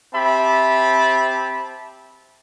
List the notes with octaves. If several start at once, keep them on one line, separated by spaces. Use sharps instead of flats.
C4 G4 E5 A5 B5